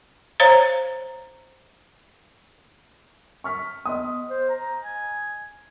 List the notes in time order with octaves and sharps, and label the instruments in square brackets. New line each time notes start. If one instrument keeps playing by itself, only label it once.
[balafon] C5 C#5 F5 A#5
[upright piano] C#6 F6 B6
[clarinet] B3 [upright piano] D#5 C6 D#6
[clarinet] C5
A#5
G#5